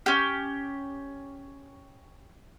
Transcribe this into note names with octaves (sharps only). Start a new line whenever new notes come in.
C#4 G4